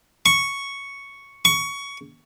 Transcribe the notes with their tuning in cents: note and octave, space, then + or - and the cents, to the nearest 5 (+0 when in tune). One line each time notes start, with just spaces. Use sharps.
C#6 +0
C#6 +15